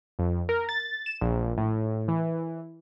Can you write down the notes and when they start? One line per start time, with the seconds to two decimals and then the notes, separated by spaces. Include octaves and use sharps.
0.19 F2
0.49 A#4
0.69 A6
1.06 E7
1.21 A#1
1.58 A2
2.08 E3